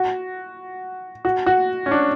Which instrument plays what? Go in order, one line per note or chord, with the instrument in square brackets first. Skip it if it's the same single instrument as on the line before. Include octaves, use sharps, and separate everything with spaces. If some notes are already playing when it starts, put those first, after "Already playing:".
Already playing: [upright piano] F#4
F#4
F#4
C#4
D4